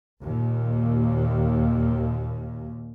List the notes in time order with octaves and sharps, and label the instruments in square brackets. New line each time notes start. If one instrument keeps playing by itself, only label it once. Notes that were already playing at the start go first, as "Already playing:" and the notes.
[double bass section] D#2 A#2